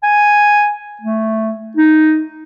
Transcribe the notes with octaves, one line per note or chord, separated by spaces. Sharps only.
G#5
A3
D#4